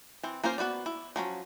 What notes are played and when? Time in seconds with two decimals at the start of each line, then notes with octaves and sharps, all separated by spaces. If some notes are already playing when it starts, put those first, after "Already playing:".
0.23 E3 C4
0.44 A#3 C#4 F4 A#4 C5
0.58 B3 F#4 B4 D5
0.86 E4
1.16 F3 F#3 C#4